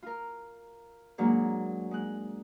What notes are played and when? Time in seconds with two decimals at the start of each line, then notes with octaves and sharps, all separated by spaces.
0.03 F4 A#4
1.18 G#2 F#3 G#3 A#3 D4
1.91 G#3 F#6